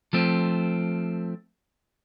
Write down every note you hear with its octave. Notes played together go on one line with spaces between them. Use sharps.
F3 A3 C4